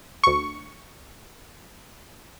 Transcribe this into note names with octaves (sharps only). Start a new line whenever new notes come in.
D2 C#6